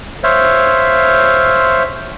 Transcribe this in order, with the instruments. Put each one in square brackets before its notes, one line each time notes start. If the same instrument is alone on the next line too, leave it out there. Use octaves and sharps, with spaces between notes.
[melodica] C5 C#5 E5 F5